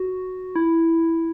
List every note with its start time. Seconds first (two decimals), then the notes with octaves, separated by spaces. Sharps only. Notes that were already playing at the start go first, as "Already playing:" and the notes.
Already playing: F#4
0.56 E4